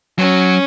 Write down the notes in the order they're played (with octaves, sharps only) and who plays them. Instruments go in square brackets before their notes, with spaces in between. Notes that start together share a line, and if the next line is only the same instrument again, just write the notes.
[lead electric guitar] F#3 [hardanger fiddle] C#4